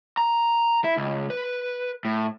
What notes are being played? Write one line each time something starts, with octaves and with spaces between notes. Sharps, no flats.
A#5
E4
C#2
B4
A2